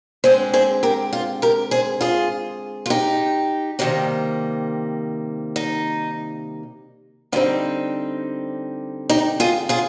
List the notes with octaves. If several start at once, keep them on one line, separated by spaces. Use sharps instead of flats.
D3 G#3 C4 G#4 C5
G#4 C5
G4 A#4
F4
G4 A#4
G#4 C5
F4 G#4
F4
D#4 G4
C3 D#3 G3 A#3
D#4
D3 G3 C4 D#4 F4
D#4 G4
F4 G#4
F4 G#4